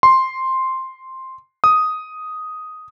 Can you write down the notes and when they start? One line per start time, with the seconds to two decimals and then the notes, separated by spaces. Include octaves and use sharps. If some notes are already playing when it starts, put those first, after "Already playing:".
0.03 C6
1.64 D#6